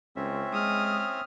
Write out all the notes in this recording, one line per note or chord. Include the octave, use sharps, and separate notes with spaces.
C#2 C4 C#4 E5
G#3 D#6 F6